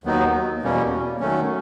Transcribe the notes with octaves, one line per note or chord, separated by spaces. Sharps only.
D#2 D#3 F#3 B3 D#4
E2 B2 G3 A#3 C#4
D#3 F#3 A3 C#4